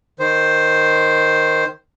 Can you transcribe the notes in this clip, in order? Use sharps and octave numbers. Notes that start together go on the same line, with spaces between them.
D#3 C5